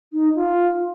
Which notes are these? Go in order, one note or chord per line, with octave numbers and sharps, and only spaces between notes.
D#4
F4